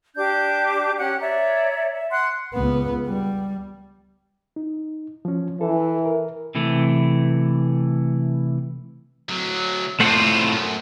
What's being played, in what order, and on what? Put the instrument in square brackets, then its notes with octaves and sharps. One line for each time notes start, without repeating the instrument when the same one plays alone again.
[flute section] D4 G4 D6 G6
C#4 G4 F#5 F#6
C#5 D5 E5 A#5
E5
F#5 C6 F#6
[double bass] C#2 B3
G3
[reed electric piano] D#4
F3 C#4
[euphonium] E3 [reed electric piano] A4
[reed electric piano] A#4
[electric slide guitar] C3 E3 A3
[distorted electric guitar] D2 F#3
[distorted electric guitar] C2 C4 [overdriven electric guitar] A2 F4 [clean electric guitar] A3 C5 F#5
[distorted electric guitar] F#2